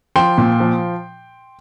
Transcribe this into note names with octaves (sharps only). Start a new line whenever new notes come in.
F3 G5 C6
A#2
F3